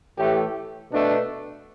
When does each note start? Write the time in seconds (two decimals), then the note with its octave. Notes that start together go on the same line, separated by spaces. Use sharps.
0.18 A2 E3 A3 G4
0.93 B2 A3 D4